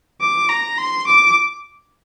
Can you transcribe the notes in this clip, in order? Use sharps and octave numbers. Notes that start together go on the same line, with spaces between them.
D6
A#5
C6
D6